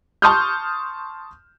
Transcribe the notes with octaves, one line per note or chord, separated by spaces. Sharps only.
A5 C6 C#6 D#6 F6 G6